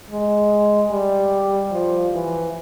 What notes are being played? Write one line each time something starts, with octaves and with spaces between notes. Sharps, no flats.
G#3
G3
F3
E3